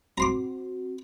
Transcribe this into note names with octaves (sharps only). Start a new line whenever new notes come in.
C4 F#4 A#5 C6 D6